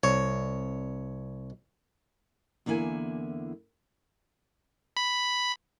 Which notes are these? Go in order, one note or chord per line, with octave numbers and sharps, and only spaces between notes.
C2 C#5
E2 D3 A#3 E4 G#5
B5